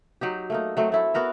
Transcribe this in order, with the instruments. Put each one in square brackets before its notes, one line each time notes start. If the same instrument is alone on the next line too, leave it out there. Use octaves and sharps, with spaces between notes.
[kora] F#3 D#4 G4
A3 A#3 D#4
F#3 A3 C4
A3 E4 A4
B3 F#4 A#4 E5